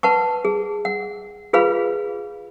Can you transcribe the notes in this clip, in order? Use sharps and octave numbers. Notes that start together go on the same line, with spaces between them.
B4 F#5 A5 C#6
G#4
F#5
F4 G#4 B4 F5 B5